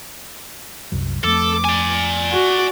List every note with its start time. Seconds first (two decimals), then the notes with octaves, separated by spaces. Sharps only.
0.92 C2 F#2 F#3
1.24 F2 A3 A4 D6
1.65 D5 G#5
2.31 F#4